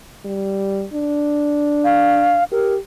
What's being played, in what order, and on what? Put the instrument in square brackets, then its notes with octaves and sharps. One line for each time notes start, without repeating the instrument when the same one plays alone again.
[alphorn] G3
D4
[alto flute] F5
[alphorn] G4 [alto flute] A#4